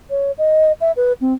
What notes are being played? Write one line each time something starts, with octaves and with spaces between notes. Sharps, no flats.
C#5
D#5
E5
B4
C4